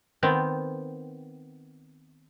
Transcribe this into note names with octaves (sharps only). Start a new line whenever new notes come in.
D#3 B3 C4